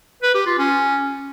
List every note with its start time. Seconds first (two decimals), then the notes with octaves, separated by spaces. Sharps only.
0.22 B4
0.34 G4
0.46 F4
0.58 C#4